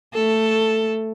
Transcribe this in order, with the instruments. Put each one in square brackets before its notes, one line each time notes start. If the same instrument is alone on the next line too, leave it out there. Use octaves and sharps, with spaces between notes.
[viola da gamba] A3 A4